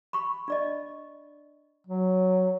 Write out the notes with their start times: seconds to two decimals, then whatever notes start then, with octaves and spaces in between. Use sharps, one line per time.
0.13 B5 C#6
0.48 D4 D5 D#5
1.87 F#3